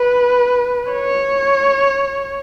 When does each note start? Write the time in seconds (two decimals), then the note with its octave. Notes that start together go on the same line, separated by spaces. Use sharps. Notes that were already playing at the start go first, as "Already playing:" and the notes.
Already playing: B4
0.92 C#5